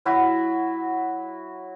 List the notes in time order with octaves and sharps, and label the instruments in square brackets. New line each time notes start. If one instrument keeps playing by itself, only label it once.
[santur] F#3 E4 F#4 E5